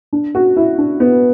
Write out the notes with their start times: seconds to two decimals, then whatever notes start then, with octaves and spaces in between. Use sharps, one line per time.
0.13 D4
0.35 F#4
0.56 E4
0.78 D4
1.00 B3